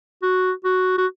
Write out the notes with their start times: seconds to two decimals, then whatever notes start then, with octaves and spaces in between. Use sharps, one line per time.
0.22 F#4
0.65 F#4
0.98 F#4